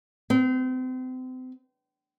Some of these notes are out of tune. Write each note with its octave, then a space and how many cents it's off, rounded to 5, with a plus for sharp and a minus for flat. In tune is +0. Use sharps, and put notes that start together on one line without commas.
C4 -35